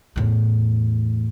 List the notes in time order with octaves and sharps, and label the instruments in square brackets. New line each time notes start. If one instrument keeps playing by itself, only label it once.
[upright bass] E2 A2